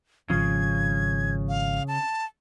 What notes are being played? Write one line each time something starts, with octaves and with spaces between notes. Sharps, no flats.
G#1 C#3 F3 G#6
F5
A5